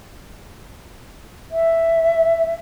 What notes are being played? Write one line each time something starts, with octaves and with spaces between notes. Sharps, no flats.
E5